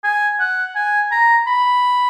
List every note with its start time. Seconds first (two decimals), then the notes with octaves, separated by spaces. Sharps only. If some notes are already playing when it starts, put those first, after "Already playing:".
0.04 G#5
0.40 F#5
0.76 G#5
1.12 A#5
1.47 B5